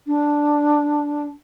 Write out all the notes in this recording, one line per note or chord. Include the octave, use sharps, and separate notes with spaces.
D4